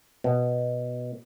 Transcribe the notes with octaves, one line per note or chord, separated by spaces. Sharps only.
B2